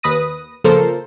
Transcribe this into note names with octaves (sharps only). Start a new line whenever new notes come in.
D#2 B4 D#6 A#6 D#7
C#3 F3 A#3 A4 A#4 C5